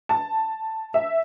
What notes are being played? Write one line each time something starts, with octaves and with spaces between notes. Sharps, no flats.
A5
E5